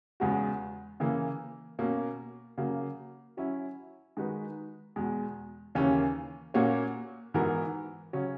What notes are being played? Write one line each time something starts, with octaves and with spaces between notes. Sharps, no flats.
E2 C#3 G#3 B3 F#4
C#3 E3 A#3
B2 A#3 C#4
C#3 F#3 A#3
F#3 C#4 E4
D#3 G#3 D#4 F#4 B4
E2 B2 G#3
D#2 C#3 E3 A#3 C#4
A#2 A#3 C#4 F#4 C#5
G#2 E3 B3 F#4 A#4
C#3 F#3 C#4